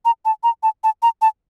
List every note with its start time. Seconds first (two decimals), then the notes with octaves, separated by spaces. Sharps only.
0.05 A#5
0.25 A5
0.43 A#5
0.63 A5
0.84 A5
1.03 A#5
1.22 A5